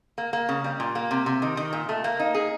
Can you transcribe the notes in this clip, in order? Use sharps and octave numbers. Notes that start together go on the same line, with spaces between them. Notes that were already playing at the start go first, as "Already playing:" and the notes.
A#3
A#3
C#3
G3
A#2
A#3
C3
C3
D#3
D#3
A#2
A3
A#3
D#4
G#4